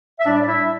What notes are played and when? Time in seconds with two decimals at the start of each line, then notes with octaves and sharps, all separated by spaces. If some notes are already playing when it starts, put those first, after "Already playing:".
0.19 E5
0.25 A2 G3 D4 D5
0.36 D5
0.47 E4 E5